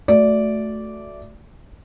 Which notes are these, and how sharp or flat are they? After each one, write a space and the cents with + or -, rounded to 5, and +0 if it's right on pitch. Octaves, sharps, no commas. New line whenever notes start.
A3 +0 F#4 -5 D5 -10